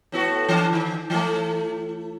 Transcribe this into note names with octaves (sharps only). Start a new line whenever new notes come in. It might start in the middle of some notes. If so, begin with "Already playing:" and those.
A2 B3 F#4
E3 D4
D#3
E3 A3